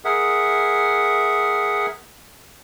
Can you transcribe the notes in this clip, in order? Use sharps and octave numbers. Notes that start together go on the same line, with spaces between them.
G#4 A#4 E5 F#5